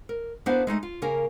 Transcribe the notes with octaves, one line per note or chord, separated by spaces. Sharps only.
A#4
A#3 B3 D4 E4 B4 C5
G#3 A3 D#4 D#5
F4
C#3 A#3 A#4 G#5